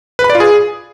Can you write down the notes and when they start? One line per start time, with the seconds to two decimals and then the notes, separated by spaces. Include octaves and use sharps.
0.19 B4
0.24 B5
0.30 D5
0.35 F4
0.40 G#4